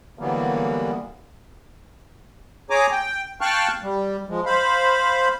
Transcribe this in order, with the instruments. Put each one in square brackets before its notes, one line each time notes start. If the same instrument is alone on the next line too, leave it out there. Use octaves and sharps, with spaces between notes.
[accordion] D3 E3 F#3 G3 A#3 B3
G#4 C#5 G#5 A#5 D6
G5
F5 G5 A5 C#6 F6 F#6
G3
F3 G#3
C5 F5 B5